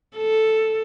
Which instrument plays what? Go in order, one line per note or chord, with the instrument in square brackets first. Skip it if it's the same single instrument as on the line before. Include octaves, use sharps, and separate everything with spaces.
[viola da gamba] A4